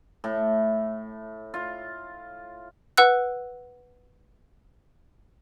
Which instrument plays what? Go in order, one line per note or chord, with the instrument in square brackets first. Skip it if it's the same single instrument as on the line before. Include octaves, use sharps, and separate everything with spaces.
[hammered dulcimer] A2
F4
[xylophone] B4 F#5 E6 F#6